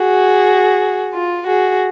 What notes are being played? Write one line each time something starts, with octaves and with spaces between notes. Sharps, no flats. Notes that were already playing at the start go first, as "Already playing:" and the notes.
Already playing: F#4 G#4
F4
F#4 G#4